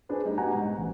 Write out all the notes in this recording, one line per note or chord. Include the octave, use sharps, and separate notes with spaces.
D4 G#4 B4 C5
G3 A3 D#4
B3 F#4 G4 F#5 G#5 A#5
G#2
A1